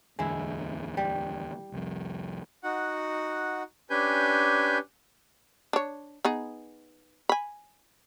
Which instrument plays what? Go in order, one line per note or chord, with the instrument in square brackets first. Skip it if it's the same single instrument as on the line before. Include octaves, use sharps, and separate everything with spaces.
[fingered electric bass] D1 E2 D3 [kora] G#3 E4
[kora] G3
[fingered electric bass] C2 F2
[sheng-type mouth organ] D#4 F#4 F#5
C#4 D4 G4 B4 G#5 G6
[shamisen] D4 C#5
B3 D#4 G#4
G#5 B5